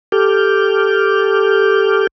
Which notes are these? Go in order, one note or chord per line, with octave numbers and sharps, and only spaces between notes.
G4 A4 D6 F6 G6